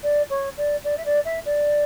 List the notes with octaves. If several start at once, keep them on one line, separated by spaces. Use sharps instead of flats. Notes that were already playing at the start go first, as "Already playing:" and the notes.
D5
C#5
D5
D5
E5
D5
E5
D5